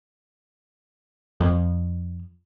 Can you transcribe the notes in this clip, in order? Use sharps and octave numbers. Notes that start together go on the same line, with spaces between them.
F2